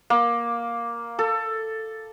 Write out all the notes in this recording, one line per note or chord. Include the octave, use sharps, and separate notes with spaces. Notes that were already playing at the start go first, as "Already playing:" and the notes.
A#3
A4